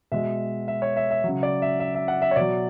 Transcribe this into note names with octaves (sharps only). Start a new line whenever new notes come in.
B2 G#3 E5
E5
C#5
E5
E5
C#3 F#3
D5
E5
E5
E5
F#5
E5
C#5
B2 D5
F#3